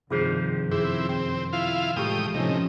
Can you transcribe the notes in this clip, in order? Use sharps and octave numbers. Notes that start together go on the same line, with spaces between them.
G2 C3 D#3 F3 F4 G#4 C5
F#2 C4 E4 G#4
C4 G5
E4 F4 F5
A2 E3 G#3 F4 G4 G5 D#6
A2 C3 F3 C#4 D#4